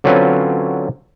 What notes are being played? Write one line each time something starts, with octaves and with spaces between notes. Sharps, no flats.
D3 F#3 C4 C#4 F4 B4